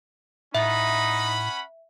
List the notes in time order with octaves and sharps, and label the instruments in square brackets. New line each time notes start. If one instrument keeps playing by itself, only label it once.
[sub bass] A2 [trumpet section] C#4 F#5 B5 [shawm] D#4 [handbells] E5